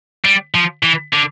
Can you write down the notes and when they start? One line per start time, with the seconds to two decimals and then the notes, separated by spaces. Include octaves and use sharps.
0.25 G3
0.55 F3
0.83 E3
1.13 D3